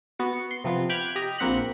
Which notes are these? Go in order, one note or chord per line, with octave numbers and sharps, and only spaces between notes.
B3 F#4 C#7
C6
C3 F3 B3
G5 B5 D6 F6 F#6 G#6
G4 D#5 A#5
A#1 A#3 C4 F#5 B5 F#6